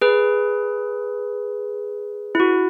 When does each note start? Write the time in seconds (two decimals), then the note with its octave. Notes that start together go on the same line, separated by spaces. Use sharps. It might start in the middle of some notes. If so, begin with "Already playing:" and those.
0.01 G#4 B4
2.35 E4
2.40 F#4